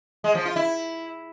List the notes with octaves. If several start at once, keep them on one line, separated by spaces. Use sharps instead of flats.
G#3
F3
F4
E4